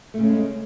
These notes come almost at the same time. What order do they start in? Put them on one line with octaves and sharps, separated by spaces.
A3 C#3 C#4 G#3